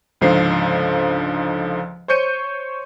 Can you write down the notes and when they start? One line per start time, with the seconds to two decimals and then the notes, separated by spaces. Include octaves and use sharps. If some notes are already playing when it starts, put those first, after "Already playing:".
0.21 C#2 G#2 D3 F3 F5 C7
2.08 C5 C#5 C#6 G6 C#7 D#7